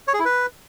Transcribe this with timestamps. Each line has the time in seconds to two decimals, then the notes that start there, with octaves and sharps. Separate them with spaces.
0.08 C#5
0.14 G#4
0.19 E4
0.25 B4